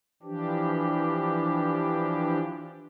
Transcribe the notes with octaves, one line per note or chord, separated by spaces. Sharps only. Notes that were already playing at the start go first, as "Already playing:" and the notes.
E3 F3 D4 G4